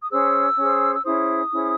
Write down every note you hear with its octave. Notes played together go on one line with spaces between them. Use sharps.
D#6
C#4 G#4 C5 E6
C#4 G#4 C5
E6
C#4 E4 G#4 C5 D#6
C#4 E4 G#4 C5